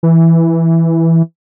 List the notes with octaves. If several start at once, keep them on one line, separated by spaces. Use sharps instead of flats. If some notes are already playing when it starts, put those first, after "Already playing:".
E3